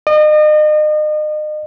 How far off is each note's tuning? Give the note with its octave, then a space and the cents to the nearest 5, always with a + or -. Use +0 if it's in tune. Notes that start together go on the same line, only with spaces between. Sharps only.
D#5 -35